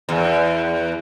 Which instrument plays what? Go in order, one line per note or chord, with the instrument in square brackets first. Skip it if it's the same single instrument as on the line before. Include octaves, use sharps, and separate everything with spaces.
[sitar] E2